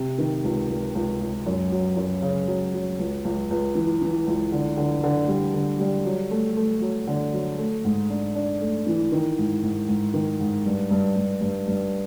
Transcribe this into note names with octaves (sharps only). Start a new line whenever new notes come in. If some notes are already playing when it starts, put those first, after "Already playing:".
Already playing: C3
D#3
C#2
C#2
C#2
C#2
F#2
F#3
F#2
C#3
F#3
F#3
C#2
C#2
C#2
E3
E3
C#2
D3
D3
D3
G3
D3
G3
F#3
A3
A3
F#3
D3
F#3
A3
G#2
D4
D4
A3
E3
D#3
G#2
G#2
G#2
D#3
G#2
G2
G2
G2
G2
G2